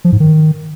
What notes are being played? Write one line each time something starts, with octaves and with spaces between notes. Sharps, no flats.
F3
G#2
D#3